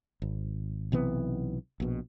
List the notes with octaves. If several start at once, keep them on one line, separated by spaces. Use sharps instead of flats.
G#1
B1 C3 E3 B3
A#1 B2